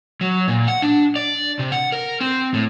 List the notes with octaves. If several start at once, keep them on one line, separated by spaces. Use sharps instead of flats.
F#3
A#2
F#5
D4
D5
C3
F#5
A#4
C4
A2